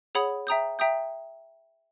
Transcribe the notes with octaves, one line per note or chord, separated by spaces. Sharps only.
G#4 C#5 F#5 B5 D#6
E5 G5 A#5 D#6 G6
E5 G5 A#5 D#6 G6